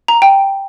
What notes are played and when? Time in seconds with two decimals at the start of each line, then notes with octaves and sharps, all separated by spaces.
0.08 A#5
0.22 G5